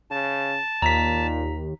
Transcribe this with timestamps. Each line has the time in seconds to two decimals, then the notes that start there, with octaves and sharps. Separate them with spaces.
0.11 C#3 A5
0.82 D#2 A#2 A#5 B6